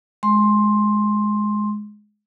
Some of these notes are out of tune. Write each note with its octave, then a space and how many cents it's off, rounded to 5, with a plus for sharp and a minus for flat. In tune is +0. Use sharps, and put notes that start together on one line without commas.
G#3 +5 C6 +10